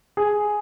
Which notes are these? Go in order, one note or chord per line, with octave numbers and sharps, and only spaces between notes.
G#4